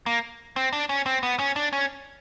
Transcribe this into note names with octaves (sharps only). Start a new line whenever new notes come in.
A#3
C4
D4
C#4
C4
B3
C#4
D4
C#4